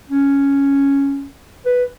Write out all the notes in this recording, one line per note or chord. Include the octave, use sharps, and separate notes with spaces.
C#4
B4